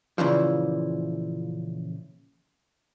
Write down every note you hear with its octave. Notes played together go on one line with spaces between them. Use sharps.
A#2 C#3 E3 F3